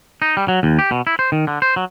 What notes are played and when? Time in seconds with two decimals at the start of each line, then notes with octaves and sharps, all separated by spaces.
0.22 D#4
0.37 G3
0.48 F#3
0.63 D#2
0.79 G4
0.91 B2
1.07 E4
1.19 C5
1.32 D#3
1.47 D3
1.62 C5
1.76 F#3